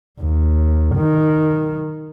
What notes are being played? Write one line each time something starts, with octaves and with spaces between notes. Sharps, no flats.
D#2
D#3